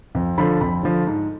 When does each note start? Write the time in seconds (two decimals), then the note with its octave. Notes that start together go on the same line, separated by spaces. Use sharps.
0.15 F2
0.38 D3 F3 B5
0.61 F2 B5
0.83 D3 F3
1.07 G#2